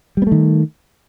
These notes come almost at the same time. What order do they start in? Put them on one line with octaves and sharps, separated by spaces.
G3 B3 A3 D#3